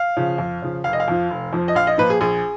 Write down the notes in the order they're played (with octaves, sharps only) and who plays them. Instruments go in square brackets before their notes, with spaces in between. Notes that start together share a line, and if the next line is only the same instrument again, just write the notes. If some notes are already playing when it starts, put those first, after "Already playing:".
Already playing: [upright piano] F5
C#3 F3
F2
C#3 F3
F1 F5
D#5
F5
F2 F3
F1
F2 F3
D#5
A#1 F5
D#5
A#2 F3 B4
G#4
A#1 G#4